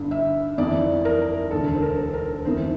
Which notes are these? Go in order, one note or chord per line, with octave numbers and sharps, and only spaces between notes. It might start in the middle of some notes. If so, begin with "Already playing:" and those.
Already playing: G1 G2 D3
E5
G1 F2 E3 D5
A#4
E1 D2 D3 A4
C5
A#4
A#4
G1 F2 E3 C5